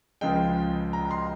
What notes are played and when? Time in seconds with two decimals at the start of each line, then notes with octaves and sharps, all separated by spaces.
0.21 C#2 C#3 F3 G#3 G5
0.93 A#5
1.11 C6